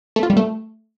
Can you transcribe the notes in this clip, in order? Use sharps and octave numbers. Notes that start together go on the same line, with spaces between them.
A3
F4
G3
A3